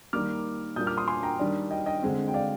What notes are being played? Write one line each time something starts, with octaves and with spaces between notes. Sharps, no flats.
D#3 G3 A#3 D6 F6
A#2 G3 A#3 D4 D#6 G6
D6 F6
C6 D#6
G#5 C6
G5 A#5
D#3 G3 D4
D#5 G5
D#5 G5
D3 G#3 C4
G5
D5 F5